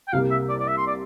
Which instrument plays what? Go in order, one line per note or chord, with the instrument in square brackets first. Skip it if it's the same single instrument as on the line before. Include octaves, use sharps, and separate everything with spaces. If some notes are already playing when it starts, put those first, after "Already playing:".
[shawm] G5
[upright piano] C2 C3 G3 A#3 [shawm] F5
[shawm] E5
D5
D5
E5
C6
D5